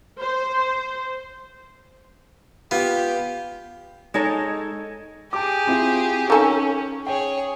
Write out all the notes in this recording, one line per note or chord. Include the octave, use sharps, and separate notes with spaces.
C5
B3 F4 G4
G#3 D#4 A4 C#5
G4 G#4 A5 D6
C4 E4 F4
D#3 C#4 A4 G#5 A#5 C#6 G6
G#4 C#5 G5